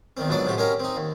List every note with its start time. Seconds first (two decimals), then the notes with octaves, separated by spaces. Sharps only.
0.17 E2 D#3 C4
0.29 A#1 G#2 F#3 B3 D4 D5
0.46 A2 C3 F3 F#4 G4
0.57 G#3 C#4 F#4 G4 A#4 C#5
0.80 C4 D#4
0.96 D#2